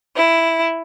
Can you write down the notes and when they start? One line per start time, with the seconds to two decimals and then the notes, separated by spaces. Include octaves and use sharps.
0.15 E4